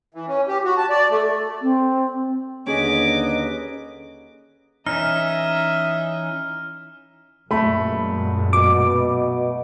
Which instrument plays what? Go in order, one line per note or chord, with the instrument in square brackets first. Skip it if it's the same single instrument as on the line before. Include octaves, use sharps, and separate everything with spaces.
[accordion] E3
C#4
G4
F#4
A5
D5
A3
[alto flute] C4
[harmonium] D#2 D3 [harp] C#4 G#4 [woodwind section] D#4 B4 D#5 [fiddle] D6
[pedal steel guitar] E3 C#4 D#4 [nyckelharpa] D#5 E5 [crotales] F6
[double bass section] F#2 A#2 G#3 [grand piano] A3 B5
[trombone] B2 [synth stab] D6